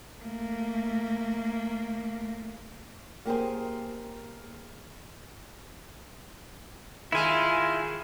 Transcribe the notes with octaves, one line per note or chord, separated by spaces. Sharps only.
A3 A#3
A#3 G4 G#4 C5
D#3 G#3 E4 F4 G#5